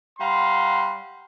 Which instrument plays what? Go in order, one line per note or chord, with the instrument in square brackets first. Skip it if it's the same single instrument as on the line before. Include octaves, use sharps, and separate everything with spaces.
[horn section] G3 F5 F#5 A#5 C6